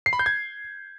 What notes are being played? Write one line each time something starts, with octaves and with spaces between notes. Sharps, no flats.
C7
B5
G6
G#6